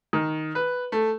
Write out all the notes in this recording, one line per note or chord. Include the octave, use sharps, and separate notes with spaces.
D#3
B4
A3